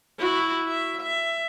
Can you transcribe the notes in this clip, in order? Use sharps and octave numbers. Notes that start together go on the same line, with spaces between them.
E4 F#4
E5
E5